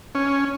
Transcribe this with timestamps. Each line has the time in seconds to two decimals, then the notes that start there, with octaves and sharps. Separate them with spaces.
0.15 C#4